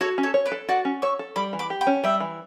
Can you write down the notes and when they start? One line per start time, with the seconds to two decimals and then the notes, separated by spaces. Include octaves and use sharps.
0.01 F#4 A4 C#5
0.18 C#4
0.23 A4 C#5
0.34 C#5
0.46 B4 D5
0.52 A4
0.69 F#4 D5 F#5
0.85 C#4
1.02 C#5 C#6 E6
1.19 A4
1.36 G3 B5 D6
1.53 E3
1.59 B5 D6
1.70 G4
1.81 G5 B5
1.87 C#4
2.04 G3 E5 G5
2.20 E3